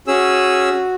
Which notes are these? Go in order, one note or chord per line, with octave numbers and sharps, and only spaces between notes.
C#4 F#4 G#4 E6